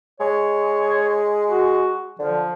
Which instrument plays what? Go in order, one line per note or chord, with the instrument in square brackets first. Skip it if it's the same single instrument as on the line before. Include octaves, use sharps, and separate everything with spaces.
[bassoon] G#3 [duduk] C#5
[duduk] F#4
[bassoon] D3 [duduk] F3